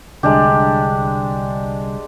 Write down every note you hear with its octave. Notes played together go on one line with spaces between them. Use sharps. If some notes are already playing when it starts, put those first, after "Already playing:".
C2 D3 G#3 D4 G4